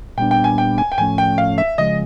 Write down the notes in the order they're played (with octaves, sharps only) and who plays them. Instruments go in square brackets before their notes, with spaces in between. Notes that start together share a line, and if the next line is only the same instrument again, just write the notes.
[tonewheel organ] A#2 G3 B3 D4 [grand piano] G5
[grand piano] G5
G#5
G5
G#5
G5
[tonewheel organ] A2 F3 A3 C#4 [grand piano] G#5
[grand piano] G5
F5
E5
[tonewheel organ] C#3 F3 G#3 [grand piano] D#5